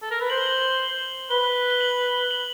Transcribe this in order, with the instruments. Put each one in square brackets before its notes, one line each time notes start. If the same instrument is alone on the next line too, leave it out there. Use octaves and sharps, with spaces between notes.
[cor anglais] A4
A#4
B4
[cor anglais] C5 [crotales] F#7
[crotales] G7
F#7
[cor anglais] B4 [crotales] G7
[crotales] G7
F#7
F#7